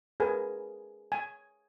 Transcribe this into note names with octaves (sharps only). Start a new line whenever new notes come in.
G#4 A#4 B4 G#5
G#5